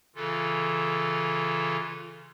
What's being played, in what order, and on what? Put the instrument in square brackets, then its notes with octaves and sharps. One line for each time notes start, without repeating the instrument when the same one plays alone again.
[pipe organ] C#3 E3 F4 A4